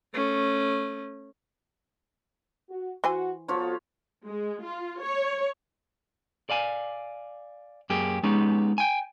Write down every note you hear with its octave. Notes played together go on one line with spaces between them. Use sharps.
A3 C#4
F#4
E3 F#4 C5 G#5
F3 B3 F4 F#4 A4 C#5
G#3
F4
C#5
D5 F5 G#5
F#2 A#3 G4 G#4
G#3 B3 C#4 D#4 G4
G5 G#5